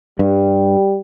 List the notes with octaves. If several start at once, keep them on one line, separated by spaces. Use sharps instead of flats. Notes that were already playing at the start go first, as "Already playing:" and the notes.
G2 G3